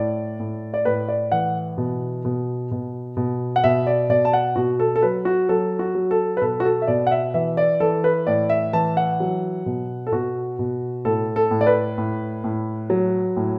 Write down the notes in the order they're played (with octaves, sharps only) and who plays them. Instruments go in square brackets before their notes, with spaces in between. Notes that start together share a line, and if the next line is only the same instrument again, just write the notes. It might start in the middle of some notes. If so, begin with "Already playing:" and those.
Already playing: [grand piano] A2 D5
A2
D5
A2 B4
D5
E3 F#5
B2
B2
B2
B2
F#5
B2 E5
D5
B2 D5
A5
F#5
B2 F#4
A4
A4
F#3 B4
F#4
F#3 A4
F#4
F#3
A4
B4
B2 A4
F#4
A4
E5
B2 D5
F#5
E5
E3 E5
D5
E3 A4
B4
A2 D5
E5
E3 A5
F#5
F#3
B2
A4
B2 F#4
B2
A2 A4
A4
A2
D5
B4
A2
A2
F#3
A2